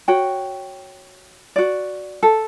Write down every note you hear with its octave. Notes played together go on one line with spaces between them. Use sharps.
F#4 C#5 G5
F#4 D5
A4